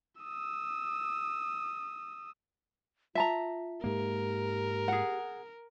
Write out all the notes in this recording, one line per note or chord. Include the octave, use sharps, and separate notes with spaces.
D#6 E6
F4 E5 A5 A#5
G#2 A#3 G4 A#4
G#4 F#5